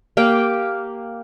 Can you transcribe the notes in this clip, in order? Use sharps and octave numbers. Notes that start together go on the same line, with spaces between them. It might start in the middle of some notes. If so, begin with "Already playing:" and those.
A#3 G4 F5 G5